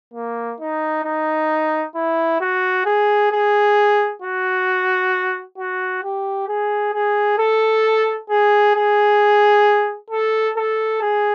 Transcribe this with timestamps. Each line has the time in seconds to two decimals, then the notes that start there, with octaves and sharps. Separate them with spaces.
0.14 A#3
0.60 D#4
1.05 D#4
1.95 E4
2.41 F#4
2.86 G#4
3.32 G#4
4.22 F#4
5.58 F#4
6.04 G4
6.48 G#4
6.93 G#4
7.39 A4
8.30 G#4
8.76 G#4
10.10 A4
10.57 A4
11.02 G#4